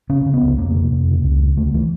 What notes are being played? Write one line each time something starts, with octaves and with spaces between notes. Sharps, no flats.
C#3 C#4
C#3
B3
C#2
F2 A#3
C3
F2
C#3
C#2
C#3
D2 A3
E3